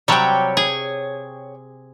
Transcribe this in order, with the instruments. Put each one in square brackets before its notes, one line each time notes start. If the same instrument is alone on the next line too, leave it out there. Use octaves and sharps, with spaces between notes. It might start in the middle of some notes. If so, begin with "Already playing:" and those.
[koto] C3 F#3 G3 [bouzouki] C#5 G5
[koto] G#4